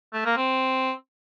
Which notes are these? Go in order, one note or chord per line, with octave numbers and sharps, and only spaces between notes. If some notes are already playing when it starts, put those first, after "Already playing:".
A3
A#3
C4